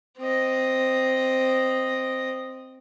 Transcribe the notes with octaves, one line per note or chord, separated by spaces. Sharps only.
C4 D#5